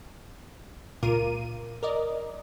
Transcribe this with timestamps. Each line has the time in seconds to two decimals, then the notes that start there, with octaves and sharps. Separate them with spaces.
1.03 C#2 A#2 F4 A#4 D6 D#7
1.83 A#4 D5 D#5